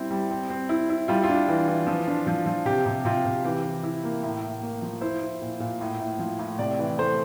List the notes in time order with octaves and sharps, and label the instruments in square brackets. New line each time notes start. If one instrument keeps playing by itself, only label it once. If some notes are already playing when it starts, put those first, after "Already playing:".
Already playing: [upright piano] G3 C4 E4
G3
C4
C4
E4
E4
G3 F4
F4
D4
E3
E3
F3
D4
F3
F3
C3 G4
C3
C3 F4
C3
E3 G4
E3
E4
A#3
A2
A2
A#3
F3
E4 C5
E4
A#2
A#2
A2
A2
F3
A2
C3 D5
E3
A3 C5